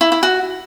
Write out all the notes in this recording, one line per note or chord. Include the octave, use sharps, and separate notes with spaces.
E4
E4
F#4